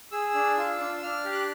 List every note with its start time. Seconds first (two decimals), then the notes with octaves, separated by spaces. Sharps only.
0.11 G#4 E6
0.34 D4
0.57 F4
0.80 D4
1.02 D4 F6
1.25 G4
1.32 F#6